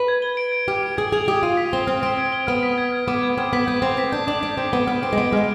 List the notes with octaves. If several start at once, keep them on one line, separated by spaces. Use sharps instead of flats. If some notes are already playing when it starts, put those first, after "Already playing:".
Already playing: B4
G#6
G7
D7
G#6
G4 F6
D7
G#4 G#6
G#4 F7
G4 D#6
F4 D#7
B6
C4 G7
C4 F6
C4 D7
G#6
G7
B3 F6
B6
G#6
F6
B3 D6
G#6
C4 F6
B3 B6
B3 G6
C4 F7
C4 B6
D4 G6
D4 D6
D4 D7
C4 G6
B3 G7
B3 F6
C4 D7
G#3
B3 B6
G#3 F6